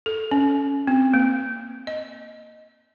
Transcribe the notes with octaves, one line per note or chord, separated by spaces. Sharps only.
A4
C#4
C4
A#3
D#5